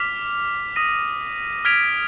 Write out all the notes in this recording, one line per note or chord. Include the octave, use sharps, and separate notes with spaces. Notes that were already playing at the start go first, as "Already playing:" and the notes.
Already playing: D6 F6 B6 F7
D#6 A#6 D#7
F6 G#6 B6 D7 F7